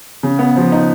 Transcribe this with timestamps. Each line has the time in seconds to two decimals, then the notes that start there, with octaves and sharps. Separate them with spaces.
0.23 C#3
0.39 B3
0.56 F3
0.72 D#4